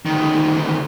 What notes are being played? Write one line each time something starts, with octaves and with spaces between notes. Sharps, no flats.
D2 D#3